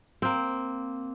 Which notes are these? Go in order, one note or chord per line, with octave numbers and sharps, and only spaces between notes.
A#3 C4